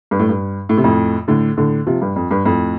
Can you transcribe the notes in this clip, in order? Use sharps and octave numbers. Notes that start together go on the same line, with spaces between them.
G2
A2
G2
A2
C3
F2 A2
A2 D3
A2 D3
C3 F3
G2
F2
G2
F2 A2